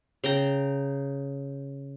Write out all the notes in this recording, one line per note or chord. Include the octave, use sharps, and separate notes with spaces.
C#3 G5 A#5